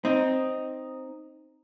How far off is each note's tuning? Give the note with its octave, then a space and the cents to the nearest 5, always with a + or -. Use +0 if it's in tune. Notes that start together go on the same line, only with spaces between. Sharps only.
C4 +0 D#4 +0